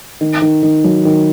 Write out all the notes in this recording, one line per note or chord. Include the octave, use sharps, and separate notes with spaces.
D#3
D#3
D#3
F#3
D#3